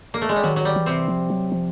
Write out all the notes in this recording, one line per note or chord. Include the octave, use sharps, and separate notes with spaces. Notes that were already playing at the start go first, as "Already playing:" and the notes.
A#3
A3
G#3
G3
D#3 F#3
F#3
G3
E3
C3 C4
F3
F#3
F3